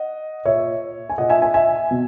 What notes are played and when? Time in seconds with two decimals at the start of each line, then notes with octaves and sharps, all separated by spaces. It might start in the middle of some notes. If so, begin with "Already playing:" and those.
Already playing: D#5 F#5
0.45 A#2 C#5 E5
1.09 G#5
1.18 A#2 D#5 F#5
1.29 E5 G#5
1.42 E5 G#5
1.54 E5 G#5
1.91 B2